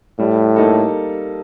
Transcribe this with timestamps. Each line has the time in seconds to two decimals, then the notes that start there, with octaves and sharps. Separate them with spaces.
0.19 A2 G3
0.56 A#3 D#4 A4